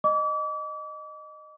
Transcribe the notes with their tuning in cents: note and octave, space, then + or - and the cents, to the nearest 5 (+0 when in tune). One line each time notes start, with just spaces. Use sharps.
D#5 -15 D6 -35